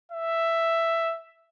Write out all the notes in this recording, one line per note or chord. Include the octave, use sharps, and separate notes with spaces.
E5